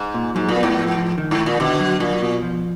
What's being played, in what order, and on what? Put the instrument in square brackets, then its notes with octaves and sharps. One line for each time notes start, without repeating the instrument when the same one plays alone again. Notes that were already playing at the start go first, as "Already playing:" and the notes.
Already playing: [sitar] G#2
[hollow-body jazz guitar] A#2
[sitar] G#2 [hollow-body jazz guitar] F#3
[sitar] A#2
[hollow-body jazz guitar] B3
[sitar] G#2
[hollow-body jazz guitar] F3
F3
D#3
[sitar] G#2
[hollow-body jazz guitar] D#3
[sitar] A#2
[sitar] B2 [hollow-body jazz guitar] D3
[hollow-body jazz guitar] F#3
[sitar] A#2 [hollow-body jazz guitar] F#3
[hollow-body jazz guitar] B2
F3